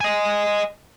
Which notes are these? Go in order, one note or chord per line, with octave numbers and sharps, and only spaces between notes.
D#5 G#5